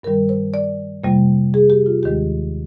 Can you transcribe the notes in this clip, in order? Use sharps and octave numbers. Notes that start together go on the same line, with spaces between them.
G2 D#3 G3 A#4
C5
D5
F2 C3 G3 A#3
G#4
G4
F4
D#2 D#3 G#3 G4